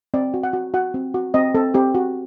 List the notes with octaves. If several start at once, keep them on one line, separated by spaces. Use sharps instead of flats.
C4 D5
F#4
F#5
F#4
F#4 F#5
C4
F#4
C4 D#5
C4 A4
C4 G4
F#4